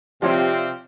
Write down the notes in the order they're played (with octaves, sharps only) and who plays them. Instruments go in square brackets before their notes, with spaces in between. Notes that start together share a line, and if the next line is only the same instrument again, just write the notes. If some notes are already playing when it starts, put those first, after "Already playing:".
[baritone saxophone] C3 [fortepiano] F3 [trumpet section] C4 G4 F5 [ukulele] F4 C#5 D5